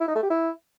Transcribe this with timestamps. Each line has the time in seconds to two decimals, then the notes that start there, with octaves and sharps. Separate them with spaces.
0.01 E4
0.08 D#4
0.15 A3
0.23 G4
0.30 E4